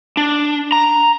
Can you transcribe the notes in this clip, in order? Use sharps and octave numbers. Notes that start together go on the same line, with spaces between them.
D4
A#5